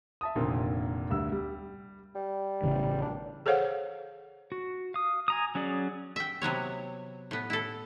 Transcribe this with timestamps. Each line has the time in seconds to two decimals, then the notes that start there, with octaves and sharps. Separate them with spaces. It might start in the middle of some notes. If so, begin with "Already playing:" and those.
0.21 E5 A5 D#6
0.35 F1 A#2 D3 D#3 A#3 C4
1.10 D2 G2 E6
1.32 G3
2.15 G3
2.63 A1 C#3 E3
3.02 D4
3.46 G#4 A4 C5 C#5 F5 F#5
4.52 F#4
4.94 F5 D#6
5.28 G#5 A#5 D#6
5.55 F#3 C#4 G#4 D5
6.16 E5 G5
6.42 C3 F#3 B3 C#5
7.31 A2 B3
7.50 E4 A4